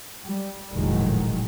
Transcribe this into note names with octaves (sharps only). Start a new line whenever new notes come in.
G3
F1 A#1 A2 D#3 F#3 G#3